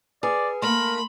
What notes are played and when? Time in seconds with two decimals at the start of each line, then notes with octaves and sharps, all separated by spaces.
0.23 G#4 B4 D5
0.62 A3 A#3 A#4 B5 C6